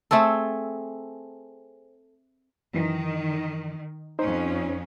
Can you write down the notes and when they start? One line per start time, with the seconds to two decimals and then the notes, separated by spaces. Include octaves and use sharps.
0.11 A3 C4 G#4 A4
2.74 F#2 D#3 E3
4.19 F2 C#4 D#4 C5